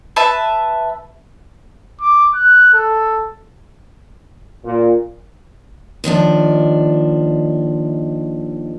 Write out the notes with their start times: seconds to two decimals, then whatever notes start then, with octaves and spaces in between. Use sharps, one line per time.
0.16 B4 E5 A5
2.01 D6
2.35 F#6
2.74 A4
4.65 A#2
6.04 D#2 D#3 F3 D4